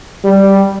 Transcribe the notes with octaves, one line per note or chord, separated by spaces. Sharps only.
G3